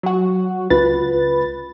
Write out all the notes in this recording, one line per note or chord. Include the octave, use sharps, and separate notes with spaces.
F#3 F#4
C#2 F4 B4 A6